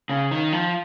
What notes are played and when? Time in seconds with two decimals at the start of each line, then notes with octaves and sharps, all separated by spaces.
0.09 C#3
0.31 D#3
0.53 F3